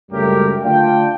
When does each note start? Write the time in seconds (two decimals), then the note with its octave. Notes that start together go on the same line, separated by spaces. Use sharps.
0.12 C#2 F#2 G3 A3 G4 A#4
0.63 D3 A3 D4 F4 G5